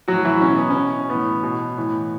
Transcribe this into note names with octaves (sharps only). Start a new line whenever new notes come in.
A2 E3 F#3 F#4
E3 E4
B2 C#4
B3
C#4
B2
A2 E3 B3
B2
A2 E3